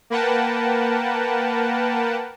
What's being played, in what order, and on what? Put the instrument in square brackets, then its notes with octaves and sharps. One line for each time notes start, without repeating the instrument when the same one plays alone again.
[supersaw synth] A#3 A#4 B4 F#5 G5 A5